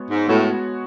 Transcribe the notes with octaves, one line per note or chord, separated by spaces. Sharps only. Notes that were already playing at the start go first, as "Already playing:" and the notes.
Already playing: G#3 B3 F#4 C#5
G#2
A2 G#3 B3 F#4 C#5